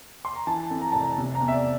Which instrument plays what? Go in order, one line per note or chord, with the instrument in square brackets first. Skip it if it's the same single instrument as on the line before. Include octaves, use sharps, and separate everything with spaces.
[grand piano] C6
A#5
E3 A5
F2
A#5
F1 A5
A#5
C3
A#5
E2
E5
D5